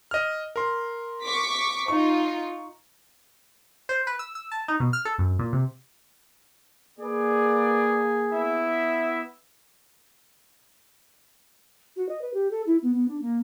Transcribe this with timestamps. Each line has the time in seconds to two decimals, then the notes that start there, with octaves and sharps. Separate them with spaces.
0.11 D#5 F6
0.56 A#4 C6
1.22 C#6 D6 B6
1.88 D#4 F4 C#6
3.89 C5
4.07 B4
4.19 E6
4.35 E6
4.51 A5
4.68 D#4
4.80 B2
4.93 F6
5.05 A4
5.18 F#2
5.39 A#2
5.53 C3
7.00 A#3 G#4 B4 D5
8.33 B3 E4 E5
11.96 F#4
12.09 D#5
12.21 B4
12.34 G4
12.51 A4
12.66 E4
12.82 B3
12.94 B3
13.08 D4
13.21 A#3